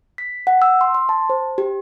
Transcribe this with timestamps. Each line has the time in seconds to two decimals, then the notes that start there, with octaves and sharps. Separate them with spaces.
0.18 B6
0.47 F#5
0.62 E6
0.81 C6
0.95 C6
1.09 A5
1.30 C5
1.58 G4